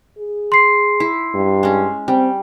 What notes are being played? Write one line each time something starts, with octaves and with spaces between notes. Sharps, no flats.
G#4
C6 C7
E4
G2
G#3 C#4
G3 C4